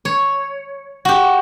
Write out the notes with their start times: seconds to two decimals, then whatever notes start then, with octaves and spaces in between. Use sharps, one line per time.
0.05 C#5
1.05 F#4 G4